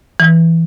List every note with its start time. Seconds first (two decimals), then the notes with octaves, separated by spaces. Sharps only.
0.20 E3